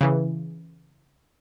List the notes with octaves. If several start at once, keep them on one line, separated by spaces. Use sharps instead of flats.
C#3 E3